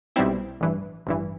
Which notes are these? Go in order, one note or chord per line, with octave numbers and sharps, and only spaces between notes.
B1 B2 G3 C4 E4
A1 G2 E3
A1 G2 E3